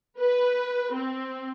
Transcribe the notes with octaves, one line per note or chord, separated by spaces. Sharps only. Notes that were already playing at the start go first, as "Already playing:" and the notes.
B4
C4